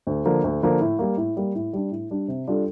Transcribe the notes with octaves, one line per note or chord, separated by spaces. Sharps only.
D2
D3 F3 A#3
D2
D3 F3 A#3
A2
G3 A#3
A2
G3 A#3
A2
G3 D4
A2
G3 D4
C3
G3 D4 F4 A4